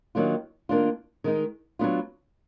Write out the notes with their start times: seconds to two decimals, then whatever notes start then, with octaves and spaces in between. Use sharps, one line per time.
0.15 D#3 F#3 A#3 D4 F4
0.69 D#3 A#3 D4 F4
1.24 D#3 G#3 D#4
1.79 F#3 B3 D4 F4